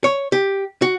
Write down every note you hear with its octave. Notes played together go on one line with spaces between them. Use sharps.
C#5
G4
F#4